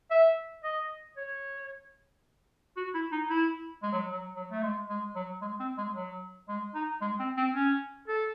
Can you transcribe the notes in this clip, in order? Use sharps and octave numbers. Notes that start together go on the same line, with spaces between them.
E5
D#5
C#5
F#4
E4
D#4
E4
G#3
F#3
F#3
F#3
A3
G#3
G#3
F#3
G#3
C4
G#3
F#3
G#3
D#4
G#3
C4
C4
C#4
A4